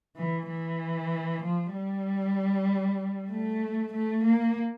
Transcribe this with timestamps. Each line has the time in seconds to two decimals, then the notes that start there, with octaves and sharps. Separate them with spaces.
0.16 E3
0.48 E3
1.42 F3
1.73 G3
3.30 A3
3.93 A3
4.24 A#3